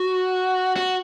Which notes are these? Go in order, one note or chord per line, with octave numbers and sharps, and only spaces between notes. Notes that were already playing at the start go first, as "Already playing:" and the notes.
Already playing: F#4
F#4